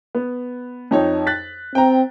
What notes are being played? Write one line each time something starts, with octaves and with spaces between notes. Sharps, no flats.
B3
F2 D#4 C#5
F#6 A6 B6
C4 G5 A#5